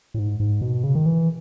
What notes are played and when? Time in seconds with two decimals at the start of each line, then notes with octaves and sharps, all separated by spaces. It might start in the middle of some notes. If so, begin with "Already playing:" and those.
0.14 A2
0.18 G#2
0.40 G#2
0.61 B2
0.83 C#3
0.95 D#3
1.05 E3